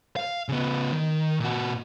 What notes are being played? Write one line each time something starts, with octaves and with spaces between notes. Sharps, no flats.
F5
C#3 B3
D#3
A#2 F#4